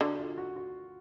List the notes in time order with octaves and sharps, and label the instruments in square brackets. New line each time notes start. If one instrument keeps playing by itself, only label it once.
[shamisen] D3 [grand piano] F#4
[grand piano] F4
F#4
F#4